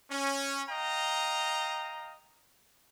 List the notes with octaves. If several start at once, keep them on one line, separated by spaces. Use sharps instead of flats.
C#4
D#5 F5 G5 A#5